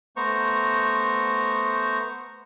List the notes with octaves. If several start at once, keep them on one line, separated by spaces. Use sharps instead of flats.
A3 B3 C5 A#5 C#6